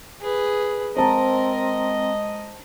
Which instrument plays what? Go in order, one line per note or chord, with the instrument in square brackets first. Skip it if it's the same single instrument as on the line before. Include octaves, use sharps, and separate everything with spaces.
[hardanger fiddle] G#4 B4
[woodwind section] G#3 D#5 [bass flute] C4 [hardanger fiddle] A#4 [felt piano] C5 A5 A#5